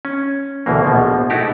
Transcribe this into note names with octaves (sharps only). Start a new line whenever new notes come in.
C#4
D2 B2 E3 A#3
A#1 B2 F3
A3 D#4 E4 F#4 G4